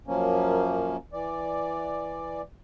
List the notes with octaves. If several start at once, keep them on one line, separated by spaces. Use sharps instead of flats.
F#2 F3 A#3 C#4
E3 D5